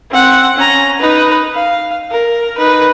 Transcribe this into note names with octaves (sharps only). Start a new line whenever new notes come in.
C4 F#5
C#4 A#5
D#4 B4
F5
A#4
D#4 B4